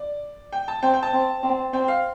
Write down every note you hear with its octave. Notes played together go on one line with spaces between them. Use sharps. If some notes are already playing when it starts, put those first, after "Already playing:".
Already playing: D5
G5
A5
C4 G5
G5
A5
C4
C4
C4 G5
F5